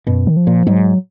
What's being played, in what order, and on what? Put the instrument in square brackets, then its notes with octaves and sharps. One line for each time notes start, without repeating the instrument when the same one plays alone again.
[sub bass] F#2 [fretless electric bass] B2
[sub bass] D#3
F3
[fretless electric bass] A#2
[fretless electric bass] G#2 [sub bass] F#3